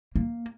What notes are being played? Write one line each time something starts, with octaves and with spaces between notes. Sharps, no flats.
A#3